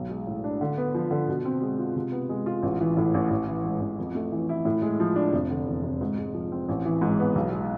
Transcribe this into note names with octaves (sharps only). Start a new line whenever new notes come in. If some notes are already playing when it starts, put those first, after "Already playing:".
Already playing: B1
G#3
A2
D4
D3
B3
F3
D3
B2
C4
G#3
F4
C3
B3
G#3
F4
A1
E3
A2
A1
A1
E3
G#2
A1
F2
A3
E3
E4
A2
G#3
F3
D4
F1
D3
E2
F1
G#2
G#3
F3
C4
A1
E3
G#2
B3
B1
G#3